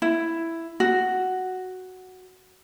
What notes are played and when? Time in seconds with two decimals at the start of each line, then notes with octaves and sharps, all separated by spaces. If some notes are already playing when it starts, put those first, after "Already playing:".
0.02 E4
0.80 F#4